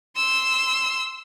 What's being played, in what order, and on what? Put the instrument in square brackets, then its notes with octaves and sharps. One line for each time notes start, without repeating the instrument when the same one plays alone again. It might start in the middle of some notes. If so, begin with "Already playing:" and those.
[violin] C6 E6